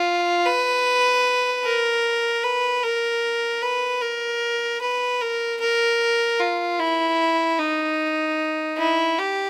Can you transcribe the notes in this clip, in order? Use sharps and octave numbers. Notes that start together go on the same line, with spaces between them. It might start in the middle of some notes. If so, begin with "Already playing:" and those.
Already playing: F4
B4
A#4
B4
A#4
B4
A#4
B4
A#4
A#4
F4
E4
D#4
E4
G4